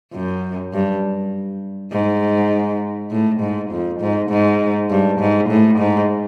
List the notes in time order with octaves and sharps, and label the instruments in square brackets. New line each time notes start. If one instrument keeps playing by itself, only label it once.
[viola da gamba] F#2
G2
G#2
A2
G#2
F2
G#2
G#2
G2
G#2
A2
G#2